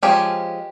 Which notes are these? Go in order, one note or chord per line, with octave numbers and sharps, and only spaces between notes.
F3 G#3 C#4 G4